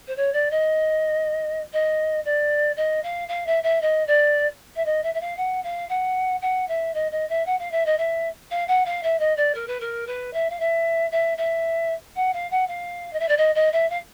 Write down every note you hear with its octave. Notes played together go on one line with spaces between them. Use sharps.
C5
C#5
D5
D#5
D#5
D5
D#5
F5
F5
E5
E5
D#5
D5
E5
D#5
E5
E5
F5
F#5
F5
F#5
F#5
E5
D#5
D#5
E5
F#5
F5
E5
D#5
E5
F5
F#5
F5
E5
D#5
D5
A#4
B4
A#4
B4
E5
F5
E5
E5
E5
F#5
F5
F#5
F5
D#5
E5
D5
D#5
D#5
E5
F5